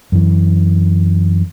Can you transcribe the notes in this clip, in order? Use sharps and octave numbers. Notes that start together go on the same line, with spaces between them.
F#2 E3